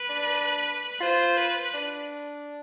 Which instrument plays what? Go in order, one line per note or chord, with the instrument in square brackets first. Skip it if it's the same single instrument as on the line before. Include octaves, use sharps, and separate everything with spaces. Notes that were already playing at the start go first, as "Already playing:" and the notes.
Already playing: [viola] B4
[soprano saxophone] D4
[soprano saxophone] F4 [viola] C5
[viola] B4
[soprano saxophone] D4